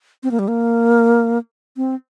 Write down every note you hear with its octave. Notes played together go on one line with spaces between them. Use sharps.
C4
A#3
G3
A#3
C4